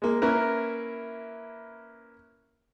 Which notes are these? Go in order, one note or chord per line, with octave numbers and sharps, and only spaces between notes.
G#3 A#3
A#3 C#4 E4 A#4 B4